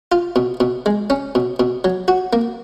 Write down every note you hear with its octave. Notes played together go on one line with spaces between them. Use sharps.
F4
B2
B2
G#3
C#4
B2
B2
F#3
F#4
A#3